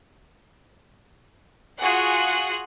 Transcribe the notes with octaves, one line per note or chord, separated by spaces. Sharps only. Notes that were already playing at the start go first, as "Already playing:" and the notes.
F4 F#4 G#4 F#5